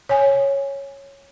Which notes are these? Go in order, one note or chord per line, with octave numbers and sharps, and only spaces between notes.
C#5 G#5